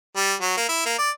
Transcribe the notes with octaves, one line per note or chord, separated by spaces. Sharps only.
G3
F#3
A#3
E4
A#3
D5